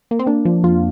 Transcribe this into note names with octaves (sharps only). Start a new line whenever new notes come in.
A#3
C4
A#3 D4
F3
F2 F4